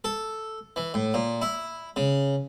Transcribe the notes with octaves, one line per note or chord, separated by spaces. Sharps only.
A4
E3
A2
A#2
E4
C#3